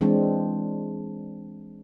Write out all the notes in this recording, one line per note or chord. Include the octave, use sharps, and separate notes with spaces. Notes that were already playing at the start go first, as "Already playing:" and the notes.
E3 G#3 C4 D4